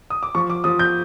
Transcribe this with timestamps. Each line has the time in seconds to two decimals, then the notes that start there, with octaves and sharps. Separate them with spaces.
0.10 D#6
0.23 D6
0.35 F3 C#6
0.50 D6
0.64 F3 D#6
0.79 G6